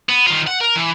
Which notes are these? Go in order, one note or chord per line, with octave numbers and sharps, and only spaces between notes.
B3
D#3 F4
F#5
A#4
E3